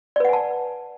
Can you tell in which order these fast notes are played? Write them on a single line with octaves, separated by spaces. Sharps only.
D5 B4 F#5 G#5 A5